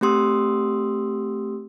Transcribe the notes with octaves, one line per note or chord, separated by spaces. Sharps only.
A3 C4 G4 C6 D#6 E6